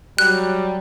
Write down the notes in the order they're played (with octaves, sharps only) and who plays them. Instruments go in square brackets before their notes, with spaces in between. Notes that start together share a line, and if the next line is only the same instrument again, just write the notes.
[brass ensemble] F#3 [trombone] G3 [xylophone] F#6